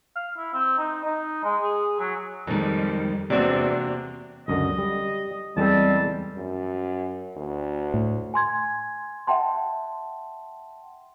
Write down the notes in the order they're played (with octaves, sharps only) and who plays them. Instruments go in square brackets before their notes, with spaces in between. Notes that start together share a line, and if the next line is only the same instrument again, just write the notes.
[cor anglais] F5
E4
C4
D#4
D#4
G#3
G#4
F#3
[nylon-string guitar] F2 D#3 [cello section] G3 G#3
[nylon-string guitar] E2 C4 D5 [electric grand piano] C3 F#4 G4 [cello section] A#3 D4
[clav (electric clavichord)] C#2 F#2 D3 [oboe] D#5
[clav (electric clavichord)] G3
[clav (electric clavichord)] E2 G#3 A4 [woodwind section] G3 C4 [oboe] A5
[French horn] F#2
D2
[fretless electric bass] A2
[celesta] G#5 C6 G#6
E5 F#5 G5 A5 C6